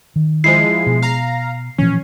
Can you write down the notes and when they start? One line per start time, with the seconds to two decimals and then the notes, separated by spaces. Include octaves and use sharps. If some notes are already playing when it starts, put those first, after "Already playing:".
0.16 D#3
0.44 F3 G#3 E4 C7
0.87 B2
1.02 F5 A#5
1.78 A#2 E3 F3 C#4